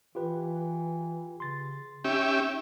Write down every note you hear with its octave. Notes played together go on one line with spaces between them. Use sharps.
E3 F4 G4 B4
C#3 C6 A6
C#4 D#4 G4 E5